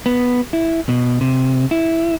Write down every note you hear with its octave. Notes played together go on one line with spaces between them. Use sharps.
B3
E4
B2
C3
E4